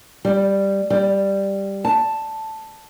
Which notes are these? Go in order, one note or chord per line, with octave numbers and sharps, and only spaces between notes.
G3
G3
A5